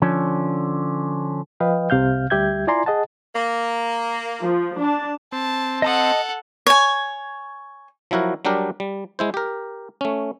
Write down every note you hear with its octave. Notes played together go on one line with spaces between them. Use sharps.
D3 F3 C#4
F3 B4 D#5 F5 G5
C2 C3 F5 F6 G6
D2 G3 G4 E5 G6 G#6
E4 F4 D5 G#5 A#5 C6
G#4 D#5 F#5 A5
A#3
F3
D4 A5
C4 A5
A4 D#5 F#5 A5 D#6
C#5 G#5
F3 F#3 E4 F#4 A#4
F#3 G3 D4 G4 A#4
G3
G#3 E4 C5
G4 A#4
A3 C#4